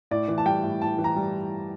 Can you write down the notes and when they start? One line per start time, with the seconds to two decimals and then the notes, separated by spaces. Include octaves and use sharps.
0.11 A2 D5
0.28 E3
0.38 A5
0.46 G3 G5
0.64 A2
0.81 A2 A5
0.98 E3
1.04 A#5
1.17 G3